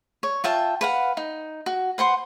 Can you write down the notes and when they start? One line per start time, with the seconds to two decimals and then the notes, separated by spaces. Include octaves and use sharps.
0.23 C#5
0.44 F4 E5 G5 A5
0.81 B4 F5 F#5
1.17 D#4
1.66 F#4
1.98 B4 C5 F#5 C6